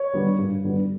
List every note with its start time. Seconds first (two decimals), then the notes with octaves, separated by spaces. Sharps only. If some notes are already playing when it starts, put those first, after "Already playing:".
Already playing: C#5
0.14 D3 G3 B3
0.39 G2
0.64 D3 G3 B3